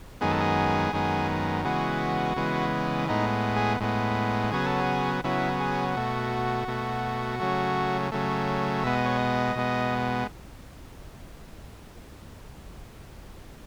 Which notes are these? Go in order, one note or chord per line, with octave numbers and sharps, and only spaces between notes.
F#2 D#3 G#3 B3 G#4
A4
G#4
F#2 D#3 G#3 B3
C#3 E3 G#3 B3 F#4
C#3 E3 G#3 B3
A2 G#3 B3 D#4
G#4
A2 G#3 B3
C#3 F#3 B3 G#4
A4
G#4
C#3 F#3 B3 E4
G#4
B2 A3 F#4
B2 A3
C#3 F#3 A3
C#3 F#3 A3
B2 G#3 B3 E5
D#5
C#5
D#5
B2 G#3 B3